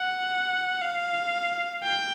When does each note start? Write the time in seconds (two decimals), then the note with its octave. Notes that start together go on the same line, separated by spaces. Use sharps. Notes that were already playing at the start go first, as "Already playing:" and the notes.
Already playing: F#5
0.82 F5
1.83 G5